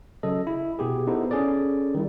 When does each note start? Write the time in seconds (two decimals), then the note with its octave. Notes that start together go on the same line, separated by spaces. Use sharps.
0.23 C#3 F#3 A4 D#5
0.47 E4
0.79 B2 B3 G4 G#4
1.07 B3 D#4 E4 A4 C5
1.31 C#4 G#4 A4 D5
1.94 D#3 G3 E4